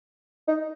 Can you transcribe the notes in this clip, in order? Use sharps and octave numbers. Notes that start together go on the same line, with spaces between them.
D#4